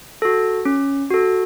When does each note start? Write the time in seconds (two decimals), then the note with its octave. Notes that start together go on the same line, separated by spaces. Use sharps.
0.22 F#4 A4
0.65 C#4
1.10 F#4 A4